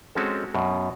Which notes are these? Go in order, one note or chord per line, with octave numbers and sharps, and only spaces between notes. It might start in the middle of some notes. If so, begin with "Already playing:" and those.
G#3 C4 C#4 F#4 A4
F#2 B2